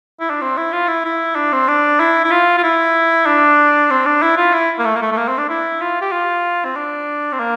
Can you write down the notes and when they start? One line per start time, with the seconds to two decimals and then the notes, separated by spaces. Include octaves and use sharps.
0.20 E4
0.30 D4
0.41 C4
0.57 E4
0.73 F4
0.88 E4
1.05 E4
1.35 D4
1.53 C4
1.68 D4
2.00 E4
2.24 E4
2.31 F4
2.57 F4
2.63 E4
3.26 D4
3.90 C4
4.06 D4
4.22 E4
4.37 F4
4.53 E4
4.79 A#3
4.85 A3
4.96 A#3
5.02 A3
5.12 A3
5.17 A#3
5.28 C4
5.38 D4
5.49 E4
5.81 F4
6.01 G4
6.12 F4
6.65 C4
6.76 D4
7.32 C4
7.40 A#3